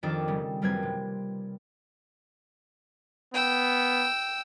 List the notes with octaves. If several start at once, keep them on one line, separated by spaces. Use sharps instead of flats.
F2 D#3 D4 G4 A4 D6
C#3 G3
F#2 G3 A#3 C4 B4 G#6
C3
B3 G5 E6